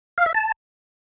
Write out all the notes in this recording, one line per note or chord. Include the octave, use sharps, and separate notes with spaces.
F5
E5
A5